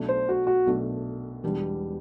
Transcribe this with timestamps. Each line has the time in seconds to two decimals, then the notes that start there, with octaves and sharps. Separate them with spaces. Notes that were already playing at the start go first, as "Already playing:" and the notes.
Already playing: B1 B2 A3 D4
0.08 C5
0.29 F#4
0.47 F#4
0.66 B1 B2 A3 D4
1.43 E1 E2 B2 G3 D4